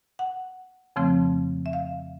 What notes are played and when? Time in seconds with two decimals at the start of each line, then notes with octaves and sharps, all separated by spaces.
0.19 F#5
0.96 F2 C#3 F3 A3 C4
1.66 E5
1.73 F5